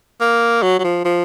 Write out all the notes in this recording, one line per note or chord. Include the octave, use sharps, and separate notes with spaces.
A#3
F#3
F#3
F3
F3